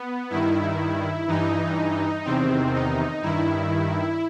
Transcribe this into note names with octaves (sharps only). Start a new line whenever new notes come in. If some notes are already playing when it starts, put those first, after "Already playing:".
Already playing: B3
G2 D#3 E4
G2 E3 D#4
E2 C3 D#3 C4
D#4
G2 D#3 E4